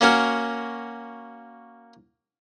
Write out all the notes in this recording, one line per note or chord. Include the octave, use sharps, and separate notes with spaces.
A#3 C#4 F#4 A#4